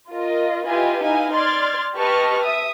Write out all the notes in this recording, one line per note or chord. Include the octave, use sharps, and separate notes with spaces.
F4 A#4 D#5
E4 F4 G4 B4 D#5 G#5
D#4 E4 F5 G#5
D5 C6 F6 G#6 A6
G4 B4 D#5 A5 C#6 F6
E5 D#6